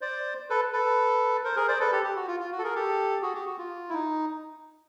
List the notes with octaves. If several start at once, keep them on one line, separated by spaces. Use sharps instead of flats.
C5 D5
A4 B4
A4 B4
A#4 C5
G#4 A#4
C5 D5
A4 B4
G4 A4
G4
F#4
F4
F4
F#4
A4
G#4 A#4
G4 A4
F#4 G#4
G4
F#4
F4
E4
D#4